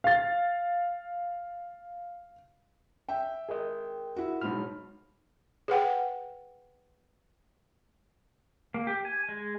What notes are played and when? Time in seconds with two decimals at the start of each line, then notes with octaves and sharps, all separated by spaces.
0.04 F5 A6
3.09 E5 G5
3.49 G#4 A#4 D#5
4.16 E4 F#4
4.41 B1 G#2 F#3 B5 F6
5.68 G#4 B4 F#5 G5
8.74 A#3
8.87 G4
9.05 G#5
9.29 G#3